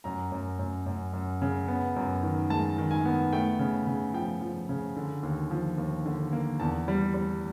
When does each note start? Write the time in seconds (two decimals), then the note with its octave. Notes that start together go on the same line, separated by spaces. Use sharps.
0.04 F#2 A#5
0.32 F#2
0.59 F#2
0.86 F#2
1.13 F#2
1.42 C#3
1.68 B3
1.96 F#2
2.23 D#3
2.50 G#3 A5
2.78 D#3
2.91 G#5
3.05 B3
3.33 A3 G5
3.59 C#3
3.87 C#3
4.14 F3 G5
4.41 F3
4.69 C#3
4.96 D3
5.23 D#2
5.51 F3
5.78 D#2
6.06 D3
6.33 A#3
6.60 E2 A5
6.88 G3
7.14 G3